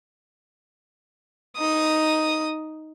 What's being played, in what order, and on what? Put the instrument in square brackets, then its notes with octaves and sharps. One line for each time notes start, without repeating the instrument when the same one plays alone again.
[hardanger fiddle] D#4 D#6